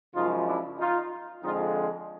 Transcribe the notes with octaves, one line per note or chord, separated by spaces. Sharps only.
F#2 C#3 F3 G#3 D#4 F4
D4 E4
D#4 F4
F2 D3 F3 G#3 D#4 F4